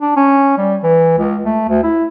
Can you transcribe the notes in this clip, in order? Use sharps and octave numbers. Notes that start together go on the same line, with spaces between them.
D4
C#4
G3
E3
C#2
A3
D2
E4